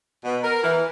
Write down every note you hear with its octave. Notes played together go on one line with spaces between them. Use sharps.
B2
A#4
E3